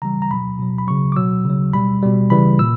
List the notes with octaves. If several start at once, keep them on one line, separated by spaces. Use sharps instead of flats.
C#3 E3 G3 A#5
A#5
B2 F#3 B5
B2 F#3
B5
C#3 F#3 C#6
D6
B2 F#3 E6
C#3 F#3
B2 G3 B5
B2 G3
C#3 E3 G3 B5
A#2 E6